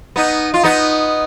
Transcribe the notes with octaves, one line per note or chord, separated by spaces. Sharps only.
B3 D#4
F4
B3 D#4